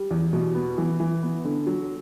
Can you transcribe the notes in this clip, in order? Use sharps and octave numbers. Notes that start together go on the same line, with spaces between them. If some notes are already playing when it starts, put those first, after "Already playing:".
Already playing: G3
E2
B2
B3
E3
E3
B3
D3
F#3